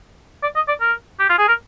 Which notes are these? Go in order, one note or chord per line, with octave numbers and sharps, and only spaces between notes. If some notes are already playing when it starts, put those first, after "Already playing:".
D5
D#5
D5
A#4
G4
F4
G#4
A#4